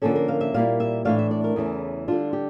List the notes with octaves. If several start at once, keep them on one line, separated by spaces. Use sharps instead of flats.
D3 F3 A#3 C#4 A4
A#4
F5
E5
A#2 G3 A#3 E4 F5
E5
A2 E3 A3 D4 F5
E5
D5
A#4
E2 C#3 E3 A3 C#4
D3 G3 D4 F4
G4